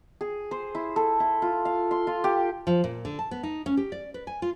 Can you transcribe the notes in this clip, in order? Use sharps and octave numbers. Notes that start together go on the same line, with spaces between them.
G#4
C5
E4
A4
E4
F4
F5
C6
F4
G4
F3
A#2
D3
A5
B3
D#4
C#4
G4
D5
B4
G#5
F4